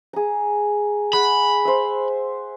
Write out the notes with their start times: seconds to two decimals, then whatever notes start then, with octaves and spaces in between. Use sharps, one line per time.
0.13 G#4 A#5
1.13 G#4 F#5 B5
1.65 C5 E5